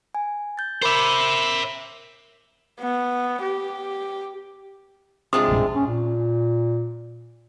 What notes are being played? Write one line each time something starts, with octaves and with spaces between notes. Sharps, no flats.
G#5
G6 A6
A#4 C5 E5 B5 D6
B3
G4
C3 G#3 D4 F4 D#6
F1 A#1 G2
C#4
A#2